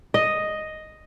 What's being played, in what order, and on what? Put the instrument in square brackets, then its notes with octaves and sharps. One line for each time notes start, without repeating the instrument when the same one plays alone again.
[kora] D#5